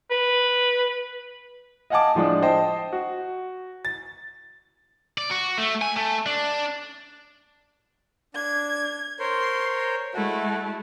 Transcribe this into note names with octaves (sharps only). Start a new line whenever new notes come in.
B4
D#5 F5 F#5 G#5 A5 D6
A2 F3 G#3 D4
C5 D#5 G5 A5
F#4
A6
D5
F#4
A3
G#5
A3
D4
D4 G#6
A#4 C5 C#5 C6
G#3 A3 E4 F#4